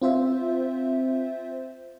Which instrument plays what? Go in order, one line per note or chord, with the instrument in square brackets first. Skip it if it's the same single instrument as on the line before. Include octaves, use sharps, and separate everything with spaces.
[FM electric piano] C4 F4 C5 E5